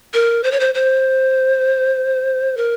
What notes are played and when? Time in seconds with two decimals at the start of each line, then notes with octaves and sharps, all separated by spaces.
0.14 A#4
0.43 C5
0.52 C#5
0.60 C5
0.75 C5
2.57 A#4